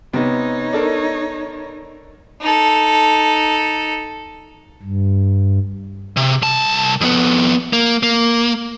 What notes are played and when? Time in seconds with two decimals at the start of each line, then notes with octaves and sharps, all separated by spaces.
0.13 C3 B3 D#4 C#5
0.73 D4 A4 A#4
2.41 D#4 A4
4.83 G2
6.17 C3
6.42 C2 A5
7.01 F2 B3
7.73 A#3
8.03 A#3